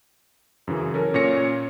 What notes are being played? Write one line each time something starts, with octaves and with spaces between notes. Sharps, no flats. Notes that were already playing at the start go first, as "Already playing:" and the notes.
F#2 C#3 E3
C#4 A4 A#4
A#2 C#4 C#5 A#6 C#7